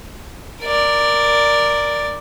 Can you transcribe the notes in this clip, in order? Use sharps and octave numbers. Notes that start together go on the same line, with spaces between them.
A#4 D5